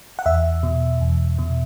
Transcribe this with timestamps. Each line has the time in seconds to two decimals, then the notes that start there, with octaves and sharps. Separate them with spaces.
0.19 F#5
0.26 E2 E5
0.63 B2
1.01 E2
1.39 B2